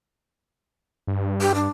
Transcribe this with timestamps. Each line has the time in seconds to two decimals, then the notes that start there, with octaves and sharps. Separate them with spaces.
1.07 G2
1.41 G4
1.55 D4